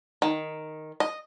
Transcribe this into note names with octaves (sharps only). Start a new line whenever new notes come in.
D#3
D#5